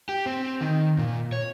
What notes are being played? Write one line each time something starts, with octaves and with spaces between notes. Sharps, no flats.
G4
C4
D#3
A#2
C#5